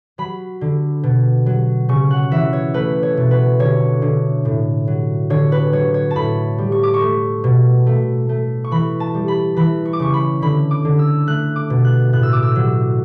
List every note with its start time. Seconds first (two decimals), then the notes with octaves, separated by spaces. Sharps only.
0.18 F#3 B5
0.61 D3
1.03 B2
1.46 F#3
1.89 C#3 C#6
2.11 F#5
2.31 E3 E5
2.53 C#5
2.74 A3 B4
3.03 C#5
3.17 B2
3.31 B4
3.59 D3 C#5
4.02 D3
4.45 A2
4.87 F#3
5.30 D3 C#5
5.52 B4
5.73 F#3 C#5
5.94 C#5
6.11 A5
6.16 A2 B5
6.58 G3
6.72 C#6
6.83 D6
6.94 C#6
7.01 A3
7.44 B2
7.86 A3
8.29 A3
8.64 C#6
8.71 E3 B5
9.00 A5
9.14 G3
9.28 B5
9.56 E3 B5
9.85 C#6
9.93 D6
10.00 C#3 C#6
10.14 B5
10.42 D3 B5
10.71 D6
10.85 D3
10.99 E6
11.27 A3 F#6
11.56 D6
11.70 B2
11.85 F#6
12.13 A2 F#6
12.23 E6
12.33 D6
12.42 E6
12.56 F#3